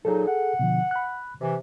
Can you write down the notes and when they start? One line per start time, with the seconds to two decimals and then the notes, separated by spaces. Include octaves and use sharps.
0.05 A#2 F#3 D#4 G#4 A4
0.27 F#5
0.59 B2 D3 F3
0.91 B5 F#6
1.41 C3 E3